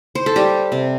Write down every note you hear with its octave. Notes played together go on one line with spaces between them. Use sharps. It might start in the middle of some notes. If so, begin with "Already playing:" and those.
C5
A4
G3 G4
C3